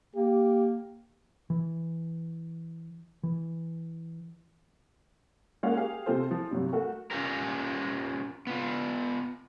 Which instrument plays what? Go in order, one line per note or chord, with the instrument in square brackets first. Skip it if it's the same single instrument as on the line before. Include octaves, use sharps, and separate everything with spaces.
[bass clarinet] A#3 [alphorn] G4
[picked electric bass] E3
E3
[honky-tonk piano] G#3 A#3 C#4 F#4 F5 F#5
G4 G#4 A#4 F5
C3 C4 F4 A4 C5
E3 F3
G2 C3 F#3
A3 F#4 A#4
[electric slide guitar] C#4 F4 G4 A#4
B3 F4